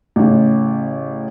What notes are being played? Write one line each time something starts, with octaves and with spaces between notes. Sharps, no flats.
A1 C#3